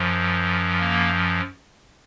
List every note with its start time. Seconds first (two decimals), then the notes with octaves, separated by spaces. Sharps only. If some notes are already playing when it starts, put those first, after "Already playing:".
Already playing: F#2 F3
0.80 A#3